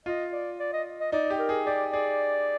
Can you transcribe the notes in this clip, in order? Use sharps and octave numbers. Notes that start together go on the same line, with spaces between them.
F4 D#5
D5
D5
D#5
D#5
D#4 D5
G4
A#4
G#4
G4 D5
G#4 D5